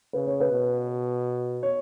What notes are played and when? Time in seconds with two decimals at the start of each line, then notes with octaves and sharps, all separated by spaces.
0.13 C#3 B4
0.27 C#5
0.40 B4
0.51 B2
1.63 C#5